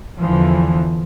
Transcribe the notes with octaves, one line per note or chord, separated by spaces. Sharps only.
E2 D3 E3 F3